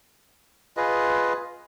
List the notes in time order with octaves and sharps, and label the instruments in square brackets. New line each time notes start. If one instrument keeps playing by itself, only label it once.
[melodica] F4 G#4 B4 D#5